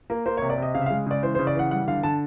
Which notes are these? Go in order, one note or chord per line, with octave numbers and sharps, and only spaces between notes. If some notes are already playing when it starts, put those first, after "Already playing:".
A#3
A#3 C5
C#5
C3
D5
C3 D#5
C#3 F5
E5
F5
G#3
C#3 D5
E3 C5
C5
C#3
D5
E3 F#5
G3 F#5
D3 F5
D3 A5